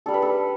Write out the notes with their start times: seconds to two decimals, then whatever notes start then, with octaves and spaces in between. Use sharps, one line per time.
0.06 G3 D4 A4
0.14 B4
0.22 A4